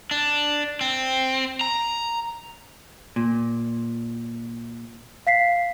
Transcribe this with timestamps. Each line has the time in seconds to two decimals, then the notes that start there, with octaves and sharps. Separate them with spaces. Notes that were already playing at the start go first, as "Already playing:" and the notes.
0.11 D4
0.81 C4
1.61 A#5
3.16 A#2
5.27 F5 B6 C7